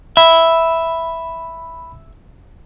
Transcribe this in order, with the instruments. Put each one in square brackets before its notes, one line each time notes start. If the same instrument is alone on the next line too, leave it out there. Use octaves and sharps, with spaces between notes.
[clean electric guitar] E5 [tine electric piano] B5